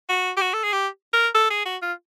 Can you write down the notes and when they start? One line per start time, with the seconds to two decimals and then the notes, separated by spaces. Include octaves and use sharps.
0.09 F#4
0.37 G4
0.41 F#4
0.54 A4
0.64 G#4
0.73 G4
1.13 A#4
1.35 A4
1.50 G#4
1.65 F#4
1.82 F4